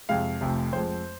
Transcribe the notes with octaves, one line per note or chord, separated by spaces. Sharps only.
F2 C3 G#3 F5
F1 F2 C3
F2 F3 G#3 C5